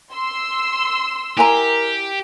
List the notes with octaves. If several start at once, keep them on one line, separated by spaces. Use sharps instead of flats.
C6 E6
E4 G4 A#4 G#5 A#5